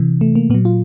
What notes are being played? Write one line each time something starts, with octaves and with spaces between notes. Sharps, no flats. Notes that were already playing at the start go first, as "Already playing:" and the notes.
Already playing: C3 E3
A3
A#3
A#2 F#3 B3
F4